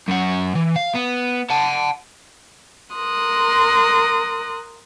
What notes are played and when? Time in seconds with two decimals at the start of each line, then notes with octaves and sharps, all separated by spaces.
0.08 F#2 F#4
0.55 E3
0.76 F5
0.95 B3
1.50 F#5 A5
2.93 A#4 C6 D#6 F#6